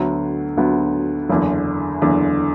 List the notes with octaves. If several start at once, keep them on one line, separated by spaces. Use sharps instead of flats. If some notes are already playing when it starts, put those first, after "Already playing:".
Already playing: D2 D3 F#3 B3
D2 D3 F#3 B3
F#1 E2 D3
F#1 E2 D3